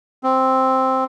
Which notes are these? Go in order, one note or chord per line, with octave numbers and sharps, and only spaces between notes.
C4